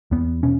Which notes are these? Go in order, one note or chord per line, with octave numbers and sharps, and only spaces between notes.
E2 B3
B2 C#4